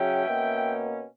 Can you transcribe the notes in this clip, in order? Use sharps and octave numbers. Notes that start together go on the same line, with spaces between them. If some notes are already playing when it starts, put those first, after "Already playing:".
Already playing: C#3 F#3 C#4 E5 G5
B2 A#3 C#4